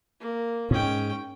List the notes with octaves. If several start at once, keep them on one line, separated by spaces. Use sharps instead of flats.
A#3
G#2 C#4 G5